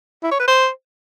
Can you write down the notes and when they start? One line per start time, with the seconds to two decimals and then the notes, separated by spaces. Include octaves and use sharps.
0.23 E4
0.31 C#5
0.40 B4
0.48 C5